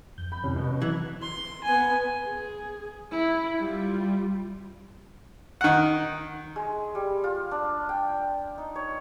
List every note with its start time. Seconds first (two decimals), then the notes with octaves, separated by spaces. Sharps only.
0.18 F2 G6
0.32 B5
0.44 C2 C3 C#4
0.56 B2
0.82 E3 F#3 F#6 G#6
1.22 C6
1.64 B3 G#5
2.25 G#4
3.11 E4
3.59 G3 F4
5.61 D#3 F#5
6.56 G#3
6.95 G3
7.24 F4
7.51 D4
7.89 G5
8.58 D#4
8.76 C#5